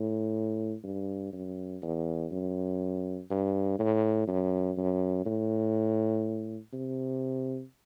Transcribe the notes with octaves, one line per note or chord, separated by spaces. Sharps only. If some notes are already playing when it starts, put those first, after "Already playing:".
Already playing: A2
G2
F#2
E2
F#2
G2
A2
F#2
F#2
A2
C3